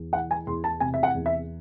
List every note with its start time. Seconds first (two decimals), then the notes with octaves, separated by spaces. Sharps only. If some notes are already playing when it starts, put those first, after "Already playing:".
Already playing: E2
0.13 E3 F#5
0.31 G#5
0.47 E2 C6
0.64 A5
0.80 C3 G#5
0.94 E5
1.03 F#5
1.14 E2
1.26 E5